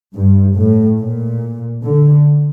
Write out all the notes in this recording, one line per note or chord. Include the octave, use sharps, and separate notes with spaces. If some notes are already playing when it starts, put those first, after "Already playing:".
G2
A2
A#2
D3